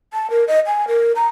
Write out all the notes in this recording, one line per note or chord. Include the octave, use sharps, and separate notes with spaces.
A5
A#4
D#5
G#5
A#4
A#5